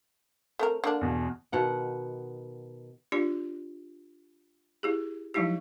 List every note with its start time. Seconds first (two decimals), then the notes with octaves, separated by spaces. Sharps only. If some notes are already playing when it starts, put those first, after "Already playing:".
0.59 A3 C4 A#4
0.84 D3 A#3 D4
1.01 E2 B2
1.52 B2 D#3 F#5 G5
3.12 D4 F4 G4 D5
4.83 E4 G4 G#4
5.34 F3 F#3 G#3 D#4 E4 G4